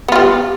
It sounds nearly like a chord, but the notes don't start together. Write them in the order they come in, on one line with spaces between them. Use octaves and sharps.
B3 F4 G3